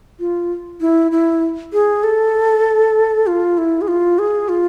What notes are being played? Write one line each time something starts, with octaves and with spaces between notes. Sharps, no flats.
F4
E4
E4
G#4
A4
F4
E4
G#4
F4
G#4
F4